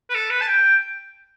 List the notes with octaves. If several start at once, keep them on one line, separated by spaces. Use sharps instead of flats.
B4
A4
B4
A5
G5